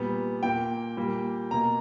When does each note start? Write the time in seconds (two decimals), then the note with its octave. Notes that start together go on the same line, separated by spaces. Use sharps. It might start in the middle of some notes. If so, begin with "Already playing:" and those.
Already playing: A#2 G3 B3
0.43 A#2 A#3 G5
0.97 A#2 G3 A#3
1.51 B2 A#3 A#5